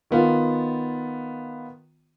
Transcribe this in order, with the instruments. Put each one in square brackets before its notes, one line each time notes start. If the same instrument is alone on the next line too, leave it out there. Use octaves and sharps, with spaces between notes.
[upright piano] D#3 B3 F4